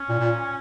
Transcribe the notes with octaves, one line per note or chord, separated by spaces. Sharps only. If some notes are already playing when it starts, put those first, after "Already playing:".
Already playing: C#4
A#2
A#2